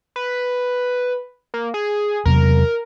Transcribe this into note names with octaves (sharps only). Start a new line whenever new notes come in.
B4
A#3
G#4
E2 C3 F#3 A#4